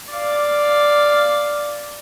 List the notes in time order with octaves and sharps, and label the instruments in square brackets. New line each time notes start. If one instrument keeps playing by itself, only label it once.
[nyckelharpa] D5 F5